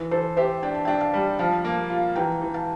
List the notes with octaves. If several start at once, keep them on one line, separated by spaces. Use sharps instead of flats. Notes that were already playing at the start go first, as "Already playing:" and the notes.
Already playing: E3
E3 A4 C5
G4 C5 E5
D4 G5
A5
D4 E5 G5
F5 A5
G3
F3 F5 A5
A#3
F4
E3 G5 A#5
E3
F5 A5